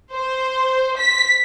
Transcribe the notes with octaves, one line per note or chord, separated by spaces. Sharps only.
C5
B6